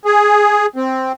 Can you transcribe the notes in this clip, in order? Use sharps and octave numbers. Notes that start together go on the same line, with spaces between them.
G#4
C4